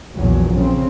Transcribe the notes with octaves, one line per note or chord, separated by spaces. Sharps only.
A#1 E2 F#3
C#3 C4